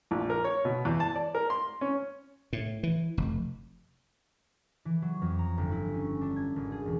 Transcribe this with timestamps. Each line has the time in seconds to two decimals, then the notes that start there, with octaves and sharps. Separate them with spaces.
0.11 A#1
0.30 A#4
0.44 C#5
0.65 B2
0.85 E2
1.00 A5
1.16 D5
1.35 A#4
1.50 C6
1.81 C#4
2.53 A2
2.83 E3
3.17 F1
4.85 E3
5.02 F#3
5.22 F2
5.39 A#5
5.58 G1
5.72 E4
5.94 C#4
6.21 D4
6.36 G#6
6.56 G#1
6.72 G#4
6.86 E1